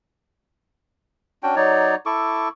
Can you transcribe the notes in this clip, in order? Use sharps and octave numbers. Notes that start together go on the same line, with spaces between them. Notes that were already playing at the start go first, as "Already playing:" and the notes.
C#4 D4 F#4 G5
F#3 D#4 C#5 D5
E4 A4 C#6 D6